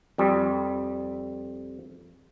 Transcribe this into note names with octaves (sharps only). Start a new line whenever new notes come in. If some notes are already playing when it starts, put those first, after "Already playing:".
F2 G3